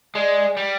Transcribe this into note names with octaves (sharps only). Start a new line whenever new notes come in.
G#3 D5
G3 D5